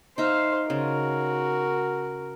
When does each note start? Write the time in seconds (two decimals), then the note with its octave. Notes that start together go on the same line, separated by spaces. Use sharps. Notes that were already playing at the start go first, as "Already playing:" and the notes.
0.18 D#4 C5 E5 F5
0.70 C#3 F#4 A#4